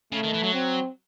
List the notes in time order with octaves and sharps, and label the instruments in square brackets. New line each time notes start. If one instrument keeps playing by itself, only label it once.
[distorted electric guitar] C#3 [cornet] A3
[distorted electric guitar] D#3
E3
F#3
[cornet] C4